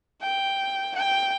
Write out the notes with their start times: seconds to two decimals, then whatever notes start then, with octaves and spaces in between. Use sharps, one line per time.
0.22 G5
0.96 G5